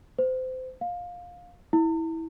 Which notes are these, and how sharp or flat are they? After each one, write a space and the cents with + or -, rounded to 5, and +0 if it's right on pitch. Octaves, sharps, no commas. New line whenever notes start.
C5 -25
F5 +20
E4 -20